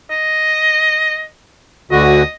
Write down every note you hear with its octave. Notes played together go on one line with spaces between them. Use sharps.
D#5
D2 D3 F#4 D#5